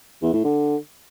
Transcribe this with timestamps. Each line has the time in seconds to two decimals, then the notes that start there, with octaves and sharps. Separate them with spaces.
0.22 E2
0.33 A2
0.44 D3